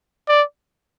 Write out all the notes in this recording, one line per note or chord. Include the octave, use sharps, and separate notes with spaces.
D5